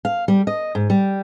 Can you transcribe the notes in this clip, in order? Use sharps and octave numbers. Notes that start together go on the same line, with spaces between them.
F5
G3
D#5
G#2
G3